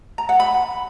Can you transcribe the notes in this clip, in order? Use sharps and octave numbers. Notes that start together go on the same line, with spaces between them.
A#5
F#5
B5